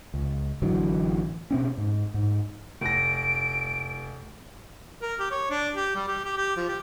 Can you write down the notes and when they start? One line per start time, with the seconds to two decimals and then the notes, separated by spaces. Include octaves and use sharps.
0.14 C#2
0.62 A1 D3 E3 F#3
1.51 B2 C4 C#4
1.78 G#2
2.14 G#2
2.81 F1 A#6 D7
5.01 A#4
5.20 G4
5.31 C#5
5.50 D4
5.75 G4
5.96 G3
6.08 G4
6.25 G4
6.37 G4
6.57 F3
6.69 G4